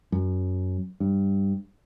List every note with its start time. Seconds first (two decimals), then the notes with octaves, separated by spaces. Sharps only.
0.12 F#2
1.00 G2